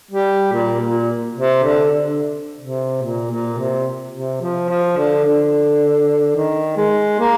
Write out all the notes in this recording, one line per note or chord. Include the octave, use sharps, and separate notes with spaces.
G3
A#2
A#2
C3
D3
D3
C3
A#2
A#2
C3
C3
F3
F3
D3
D3
D#3
G#3
A#3